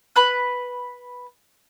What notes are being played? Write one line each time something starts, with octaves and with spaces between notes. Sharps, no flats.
B4 B5 F#6